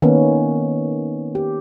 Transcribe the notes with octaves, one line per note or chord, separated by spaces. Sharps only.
D#3 A#3 B3 C#4
G4